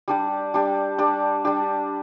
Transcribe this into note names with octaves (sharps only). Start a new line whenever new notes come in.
G3 D4 G4
G3 D4 G4
G3 D4 G4
G3 D4 G4